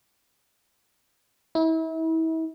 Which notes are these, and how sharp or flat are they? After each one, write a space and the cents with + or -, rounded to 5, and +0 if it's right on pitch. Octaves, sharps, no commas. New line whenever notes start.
E4 -35